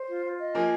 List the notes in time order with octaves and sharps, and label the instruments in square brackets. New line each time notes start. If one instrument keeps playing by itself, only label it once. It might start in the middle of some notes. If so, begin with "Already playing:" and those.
Already playing: [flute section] C5
F4
F4
D#5
[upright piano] F3 A#3 [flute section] G#5